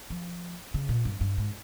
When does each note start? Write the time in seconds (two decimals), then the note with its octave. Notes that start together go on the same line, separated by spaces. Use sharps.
0.10 F3
0.74 C#3
0.89 A#2
1.05 G2
1.21 G2
1.38 G#2